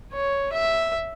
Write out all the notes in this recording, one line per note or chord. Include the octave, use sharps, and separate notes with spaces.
C#5
E5